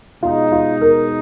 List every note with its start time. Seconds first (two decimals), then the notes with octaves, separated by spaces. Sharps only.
0.22 B2 G#3 D#4 F4
0.52 F4
0.81 A#4